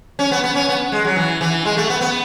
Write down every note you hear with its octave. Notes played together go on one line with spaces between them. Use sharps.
C#4
B3
B3
C#4
B3
G#3
F#3
E3
E3
G#3
A3
B3
B3